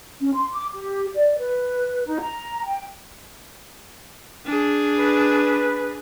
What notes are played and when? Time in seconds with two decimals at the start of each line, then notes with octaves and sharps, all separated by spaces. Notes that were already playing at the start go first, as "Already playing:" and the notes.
0.21 C#4
0.34 C6
0.52 D6
0.74 G4
1.15 D5
1.38 B4
2.05 D#4
2.20 A#5
2.67 G5
4.46 D4 G#4
4.98 B4